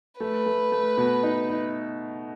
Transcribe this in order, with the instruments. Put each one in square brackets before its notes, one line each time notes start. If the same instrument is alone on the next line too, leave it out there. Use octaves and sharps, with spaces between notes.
[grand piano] A3 [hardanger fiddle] B4
[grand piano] A3
A3
B2
D#4
D#4